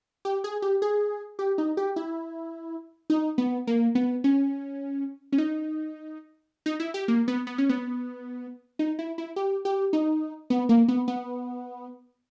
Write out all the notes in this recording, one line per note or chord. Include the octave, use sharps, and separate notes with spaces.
G4
G#4
G4
G#4
G4
D#4
G4
E4
D#4
B3
A#3
B3
C#4
C#4
D#4
D#4
E4
G4
A#3
B3
B3
C#4
B3
D#4
E4
E4
G4
G4
D#4
B3
A#3
B3
B3